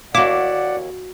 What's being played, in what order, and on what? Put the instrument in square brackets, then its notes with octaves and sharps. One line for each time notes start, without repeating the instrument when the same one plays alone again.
[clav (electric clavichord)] D#2 E4 [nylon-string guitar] F#4 F5 [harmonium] D5 F#5 [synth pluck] D6